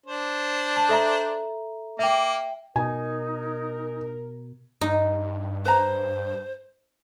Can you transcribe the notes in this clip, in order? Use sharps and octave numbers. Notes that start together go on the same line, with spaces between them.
D4 C5
A5
A4 E5 A#5
A#3 E5 G5 D6
B2 D#4 A#4 G#5
G2 D#4
B4 C5 A#5